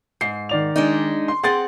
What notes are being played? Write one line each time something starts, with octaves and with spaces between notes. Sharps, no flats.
G#2 C7
D#3 D5 F7
G#3 D4 D#4
C6
C4 G#4 F#5 C6 A6